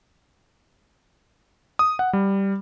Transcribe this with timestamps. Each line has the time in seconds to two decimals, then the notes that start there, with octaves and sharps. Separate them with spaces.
1.79 D#6
1.99 F#5
2.13 G3